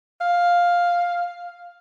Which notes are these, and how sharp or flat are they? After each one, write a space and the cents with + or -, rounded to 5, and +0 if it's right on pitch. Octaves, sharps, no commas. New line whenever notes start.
F5 +5